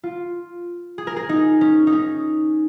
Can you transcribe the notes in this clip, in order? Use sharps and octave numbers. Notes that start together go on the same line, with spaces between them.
F4
G#4
A#4
G#4
D#4
C#4
D#4
C#4